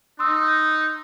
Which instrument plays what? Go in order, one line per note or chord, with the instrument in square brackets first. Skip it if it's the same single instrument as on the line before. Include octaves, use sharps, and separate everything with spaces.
[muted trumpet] D#4 [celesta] C6 D#6 E6